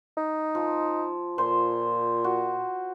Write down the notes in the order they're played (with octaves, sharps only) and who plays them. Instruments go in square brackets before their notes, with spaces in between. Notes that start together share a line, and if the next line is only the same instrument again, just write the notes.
[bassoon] D#4
[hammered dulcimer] F3
[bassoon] A#2 [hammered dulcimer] C5
[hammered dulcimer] F#4